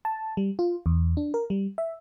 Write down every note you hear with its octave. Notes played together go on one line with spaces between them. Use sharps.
A5
G3
F4
E2
D4
A#4
G3
E5